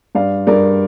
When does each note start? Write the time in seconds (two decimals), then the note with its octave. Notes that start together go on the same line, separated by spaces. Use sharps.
0.15 G2 D5 F5
0.47 G2 A#4 D5